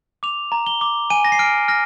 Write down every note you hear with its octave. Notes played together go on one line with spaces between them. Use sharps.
D6 F7
A#5
G7
D6
G#5 D#7
A#6
C7
F6 D7
F6 A#6